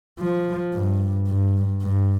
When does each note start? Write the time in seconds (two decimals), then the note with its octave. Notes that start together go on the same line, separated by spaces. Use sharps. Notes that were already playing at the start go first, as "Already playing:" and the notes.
0.20 F3
0.75 G2
1.28 G2
1.83 G2